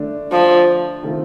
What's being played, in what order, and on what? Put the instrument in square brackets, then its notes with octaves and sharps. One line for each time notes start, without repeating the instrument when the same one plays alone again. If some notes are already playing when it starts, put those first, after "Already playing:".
Already playing: [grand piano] D3 A3 D4
[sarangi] F3
[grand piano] C3 D#3 A3 C4 F4